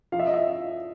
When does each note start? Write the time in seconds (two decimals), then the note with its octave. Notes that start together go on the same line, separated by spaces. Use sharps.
0.12 F3 F5
0.19 E5
0.27 D#5
0.34 E5